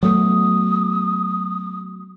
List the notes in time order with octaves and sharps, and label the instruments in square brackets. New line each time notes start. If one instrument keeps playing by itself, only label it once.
[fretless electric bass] F#3 A3 B3 [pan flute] D#6